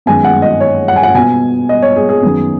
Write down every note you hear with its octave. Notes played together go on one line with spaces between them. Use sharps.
F#2 D#3 G#3 B3 G#5
F#5
D#5
C#5
F#5
G#5
F#5
B2 B3 G#5
D#5
C#5
G#4
G#4
F#2 D#3 B3